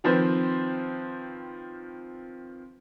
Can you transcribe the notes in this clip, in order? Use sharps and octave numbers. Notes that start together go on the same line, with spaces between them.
D#3 F3 C4 B4 C5